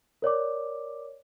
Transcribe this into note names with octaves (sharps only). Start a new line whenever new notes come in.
A#4 C#5 D5 D6